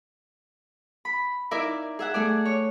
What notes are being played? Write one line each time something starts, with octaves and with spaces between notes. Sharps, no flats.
B5
D#4 E4 A#4 D5 E5
G#4 E5 F#5
A3 G#4 D5
C#5